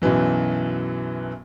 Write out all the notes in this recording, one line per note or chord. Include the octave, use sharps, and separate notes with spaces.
B1 F#2 E3 F#3